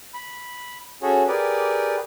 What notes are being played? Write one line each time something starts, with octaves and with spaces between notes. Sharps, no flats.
B5
C#4 F#4 G#4 A4 C#5
G4 G#4 A#4 B4 D5